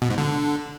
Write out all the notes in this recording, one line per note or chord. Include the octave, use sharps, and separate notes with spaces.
B2
G#2
D3